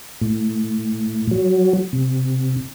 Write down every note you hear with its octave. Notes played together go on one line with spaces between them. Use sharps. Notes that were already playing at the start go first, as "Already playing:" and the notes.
A2
F#3
C3